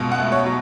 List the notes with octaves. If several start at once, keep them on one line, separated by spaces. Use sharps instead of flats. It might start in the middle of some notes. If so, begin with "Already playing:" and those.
Already playing: C#2 B2
F#5
A3
C#5
F#3